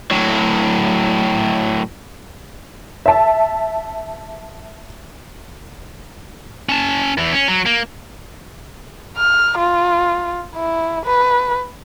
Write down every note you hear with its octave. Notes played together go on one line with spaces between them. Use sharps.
A2 F#3
E5 A5
C#4 A5
E2 E3
C#4
F#3
A#3
F6
F4
E4
B4